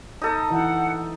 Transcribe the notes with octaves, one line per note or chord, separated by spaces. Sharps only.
D#4 A4 D#5
E3 F#5